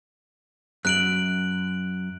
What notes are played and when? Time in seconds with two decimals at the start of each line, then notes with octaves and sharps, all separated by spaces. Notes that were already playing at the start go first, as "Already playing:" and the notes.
0.85 F#2 F#6 D7 F#7